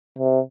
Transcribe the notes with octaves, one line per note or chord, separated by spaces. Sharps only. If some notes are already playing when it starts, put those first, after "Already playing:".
C3